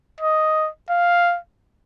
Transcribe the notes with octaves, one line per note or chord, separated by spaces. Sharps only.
D#5
F5